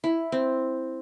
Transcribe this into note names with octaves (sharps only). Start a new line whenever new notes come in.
E4
C4